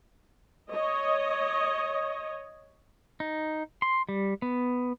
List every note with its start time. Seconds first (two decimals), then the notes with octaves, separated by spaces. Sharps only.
0.72 C#5 D#5
3.20 D#4
3.82 C6
4.09 G3
4.42 B3